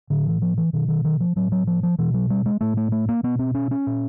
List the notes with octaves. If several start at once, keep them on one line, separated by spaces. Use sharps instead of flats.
A2 D3
E3
F3
E3
B2 D#3
D#3
D#3
F3
A2 F#3
F#3
F3
F3
B2 E3
F#3
G3
G#3
A2 A3
A3
A3
A#3
B2 B3
C4
C#4
C#4
A#2